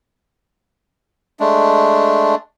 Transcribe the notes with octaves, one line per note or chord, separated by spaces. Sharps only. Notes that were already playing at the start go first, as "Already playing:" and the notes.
G#3 A3 D4